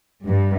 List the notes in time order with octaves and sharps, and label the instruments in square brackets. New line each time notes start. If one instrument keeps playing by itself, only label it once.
[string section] G2